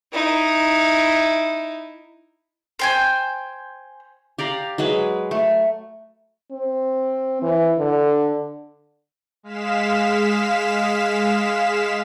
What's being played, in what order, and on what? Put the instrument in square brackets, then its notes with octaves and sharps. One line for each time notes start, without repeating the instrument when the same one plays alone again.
[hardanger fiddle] D#4 E4
[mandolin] C5 G5 G#5
[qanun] G4 D5 F5 A#5
F#3 G#3 G#4 B4
A3
[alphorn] C4
E3
D3
[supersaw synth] G#3 F5 B6 E7